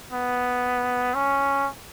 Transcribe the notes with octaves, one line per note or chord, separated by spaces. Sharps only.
B3
C#4